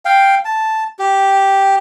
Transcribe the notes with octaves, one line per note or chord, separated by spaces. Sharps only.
F5 G5
A5
G4